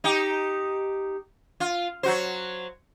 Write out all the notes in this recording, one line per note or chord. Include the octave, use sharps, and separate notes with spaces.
D#4 G4
F4
F#3 F#4 C5